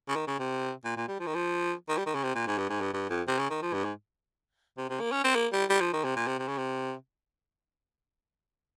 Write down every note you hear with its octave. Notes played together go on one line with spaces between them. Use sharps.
C#3
D#3
C#3
C3
A#2
A#2
G3
F3
D#3
F3
D#3
G3
D#3
C#3
C3
A#2
G#2
G2
G#2
G2
G2
F2
C3
C#3
D#3
F3
G2
G#2
C3
C3
A#3
C#4
C4
A#3
G3
G3
F3
D#3
C3
A#2
C3
C3
C#3
C3